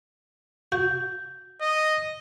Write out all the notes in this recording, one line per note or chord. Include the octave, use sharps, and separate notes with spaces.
F#4 G6
D#5